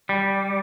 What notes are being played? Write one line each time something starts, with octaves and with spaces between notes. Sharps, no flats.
G3